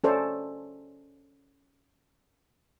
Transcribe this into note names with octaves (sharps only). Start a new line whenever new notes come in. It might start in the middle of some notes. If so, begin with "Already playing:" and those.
C#4 A4 C5 D5